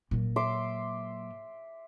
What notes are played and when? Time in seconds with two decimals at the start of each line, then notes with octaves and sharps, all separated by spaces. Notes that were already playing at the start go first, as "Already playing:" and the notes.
0.11 A#2 F#3
0.36 E5 C6 D6